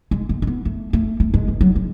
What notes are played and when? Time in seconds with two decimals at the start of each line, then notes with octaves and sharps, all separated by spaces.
0.11 G#3
0.29 A3
0.42 C#4
0.47 B3
0.65 A3
0.93 A3
1.20 A3
1.34 G#3
1.48 E3
1.61 F#3
1.75 G#3